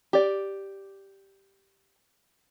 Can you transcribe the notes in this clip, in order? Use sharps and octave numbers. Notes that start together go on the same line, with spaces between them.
G4 D5